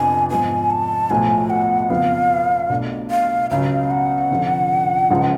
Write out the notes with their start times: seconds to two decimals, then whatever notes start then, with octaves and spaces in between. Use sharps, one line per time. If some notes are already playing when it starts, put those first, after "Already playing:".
Already playing: F1 F2 F3 B3 D4 G#5
0.30 G#2 F3 B3 G#5
0.70 A5
1.10 B1 A2 F3 A3 G#5
1.50 F#5
1.90 F#1 F2 F3 B3 F5
2.70 B1 B2 A3 D4
3.10 F5
3.50 C#2 C#3 F#3 F5
3.90 F#5
4.30 F1 F2 D3 F3
5.10 C#2 C#3 F3 G#3